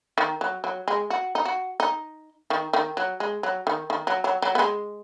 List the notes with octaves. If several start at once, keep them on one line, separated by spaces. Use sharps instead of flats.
D#3
F#3
F#3
G#3
F#4
D#4
F#4
D#4
D#3
D#3
F#3
G#3
F#3
D#3
D#3
F#3
F#3
F#3
B3
G#3